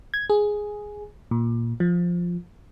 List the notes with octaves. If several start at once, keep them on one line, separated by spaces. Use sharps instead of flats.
G#6
G#4
A#2
F3